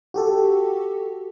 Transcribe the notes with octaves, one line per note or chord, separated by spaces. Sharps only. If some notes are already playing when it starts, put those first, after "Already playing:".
F#4 G4 A4